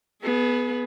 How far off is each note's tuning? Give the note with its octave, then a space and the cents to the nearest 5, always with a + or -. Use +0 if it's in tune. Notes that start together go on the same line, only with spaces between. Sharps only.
B3 +0 G#4 +35